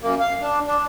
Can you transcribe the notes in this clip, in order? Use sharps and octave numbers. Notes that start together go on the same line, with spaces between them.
F#2 A#3
F5
D4
D4